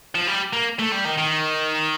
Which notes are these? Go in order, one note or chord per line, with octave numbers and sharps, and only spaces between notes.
F3
G3
A#3
A3
G3
D#3
D#3